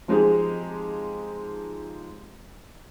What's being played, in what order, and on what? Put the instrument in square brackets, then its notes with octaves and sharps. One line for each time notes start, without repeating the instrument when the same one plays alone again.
[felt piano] F3 G#3 C4 D#4 G4 G#4